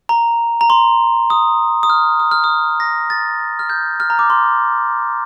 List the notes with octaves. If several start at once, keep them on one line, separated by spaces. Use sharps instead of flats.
A#5
A#5
C6
D#6
D#6
F6
D#6
F6
D#6
A#6
A6
F6
G6
F6
A#5
D6
C6